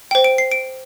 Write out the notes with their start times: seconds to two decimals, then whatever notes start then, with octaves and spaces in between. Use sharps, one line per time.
0.11 C5 G5
0.24 D7
0.38 C7
0.52 D7